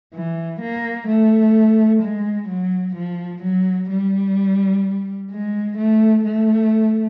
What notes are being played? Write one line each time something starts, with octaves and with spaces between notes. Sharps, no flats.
E3
A#3
A3
G#3
F#3
F3
F#3
G3
G#3
A3
A3